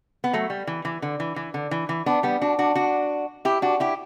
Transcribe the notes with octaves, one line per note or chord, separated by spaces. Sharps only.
B3
F#3 A3
G3
E3
E3
D3
E3
E3
D3
E3
E3
B3 D4
G3 B3
D4 F#4
D4 F#4
D4 F#4
E4 G4
D4 F#4
E4 G4